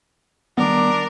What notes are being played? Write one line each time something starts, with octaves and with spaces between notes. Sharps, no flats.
D#3 G3 B3 D4 A#4